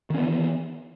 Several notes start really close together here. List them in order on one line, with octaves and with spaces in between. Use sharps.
D#3 C#4 B3 E3